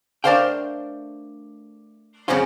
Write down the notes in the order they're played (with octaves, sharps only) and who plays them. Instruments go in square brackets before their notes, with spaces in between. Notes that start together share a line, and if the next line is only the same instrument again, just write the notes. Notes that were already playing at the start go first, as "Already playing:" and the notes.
[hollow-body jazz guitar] A3 D4 A#4 C5 F5 G5
F#2 C#3 F3 C4 C#4 F4